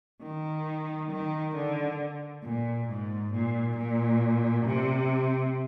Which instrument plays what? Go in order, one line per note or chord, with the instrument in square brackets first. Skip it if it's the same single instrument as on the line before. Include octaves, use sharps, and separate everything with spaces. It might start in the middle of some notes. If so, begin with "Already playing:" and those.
[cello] D#3
D#3
D3
A#2
G#2
A#2
A#2
C3